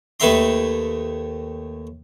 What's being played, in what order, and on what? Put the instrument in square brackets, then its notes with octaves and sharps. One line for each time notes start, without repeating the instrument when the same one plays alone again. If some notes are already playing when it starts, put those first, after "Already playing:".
[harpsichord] D#2 A3 B4 E5 A#5 C6